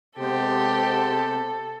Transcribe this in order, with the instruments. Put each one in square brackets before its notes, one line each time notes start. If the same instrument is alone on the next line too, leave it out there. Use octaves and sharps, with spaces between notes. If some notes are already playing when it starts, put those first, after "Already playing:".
[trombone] C3 [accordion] G#3 B3 C5 [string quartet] G4 [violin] A4